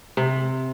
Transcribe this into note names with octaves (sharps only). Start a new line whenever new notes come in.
C3